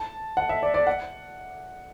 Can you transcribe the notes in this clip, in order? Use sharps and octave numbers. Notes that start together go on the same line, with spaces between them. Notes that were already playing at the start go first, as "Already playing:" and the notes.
Already playing: A5
F#5
E5
D5
D5
F#5